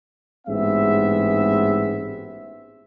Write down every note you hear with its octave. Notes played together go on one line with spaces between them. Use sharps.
A1 G#2 B3 C4 G#4 E5